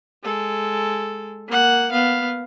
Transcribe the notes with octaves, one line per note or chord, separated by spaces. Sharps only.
G#3 A4
A#3 F#5
B3 F5